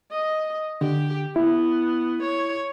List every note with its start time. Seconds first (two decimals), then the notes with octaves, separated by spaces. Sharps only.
0.11 D#5
0.81 D3 G4
1.36 B3 E4
2.23 C#5